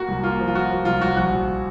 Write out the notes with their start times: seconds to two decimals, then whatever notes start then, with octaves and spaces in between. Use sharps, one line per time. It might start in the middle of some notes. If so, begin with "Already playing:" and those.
Already playing: A#3 F#4
0.08 C2
0.23 A#3 F4
0.39 F3
0.48 F4
0.55 A#3 F#4
0.70 F3
0.85 C2 F4
1.01 C2 F#4
1.16 A#1 F#4
1.32 A#1